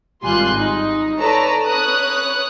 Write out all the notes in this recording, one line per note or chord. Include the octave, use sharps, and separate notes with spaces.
G#1 G3 F4 G#5 C6 F#6
D#4
A4 B4 C#5 D5 A5 A#5
B4 C#5 D#6 F#6